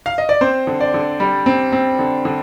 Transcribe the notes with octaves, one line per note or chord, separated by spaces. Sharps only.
F5
D#5
D5
C4 C5
D3
D5
D3
G3
C4
C4
D3
D3